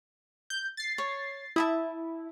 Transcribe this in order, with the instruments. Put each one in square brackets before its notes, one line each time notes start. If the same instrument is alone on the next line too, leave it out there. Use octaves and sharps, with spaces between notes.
[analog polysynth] G6
A6 C7
[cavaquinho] C#5
[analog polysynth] E4 [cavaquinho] E5 A5 D#6